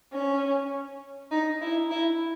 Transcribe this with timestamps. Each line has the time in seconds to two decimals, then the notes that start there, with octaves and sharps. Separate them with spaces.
0.12 C#4
1.31 D#4
1.60 E4
1.90 E4